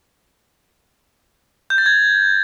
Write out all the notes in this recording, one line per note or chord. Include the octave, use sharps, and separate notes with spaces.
G6
A6
G#6